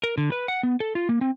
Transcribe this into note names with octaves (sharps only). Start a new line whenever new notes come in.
A#4
D3
B4
F#5
B3
A4
F4
A#3
C4